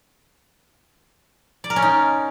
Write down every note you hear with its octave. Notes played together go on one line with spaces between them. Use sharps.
D5
A#4
C#4
D#4